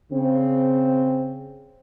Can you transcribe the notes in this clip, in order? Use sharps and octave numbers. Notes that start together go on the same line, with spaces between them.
C#3 C4